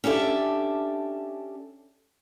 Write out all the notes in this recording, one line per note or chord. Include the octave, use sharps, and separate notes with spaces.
C#4 D4 G4 A4 E5